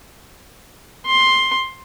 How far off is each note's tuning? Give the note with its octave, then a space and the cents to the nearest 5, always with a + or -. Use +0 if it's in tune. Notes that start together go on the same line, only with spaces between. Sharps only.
C6 +10